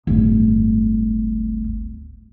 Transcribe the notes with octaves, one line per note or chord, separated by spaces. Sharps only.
D1 G1